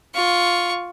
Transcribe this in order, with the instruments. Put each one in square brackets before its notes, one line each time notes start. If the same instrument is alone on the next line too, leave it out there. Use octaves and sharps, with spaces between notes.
[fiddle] F4 C#6